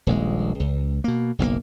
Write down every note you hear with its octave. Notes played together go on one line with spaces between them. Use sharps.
D#1 A#1 G#3
C#2
B2 A#3
F#1 B1 A2 A#3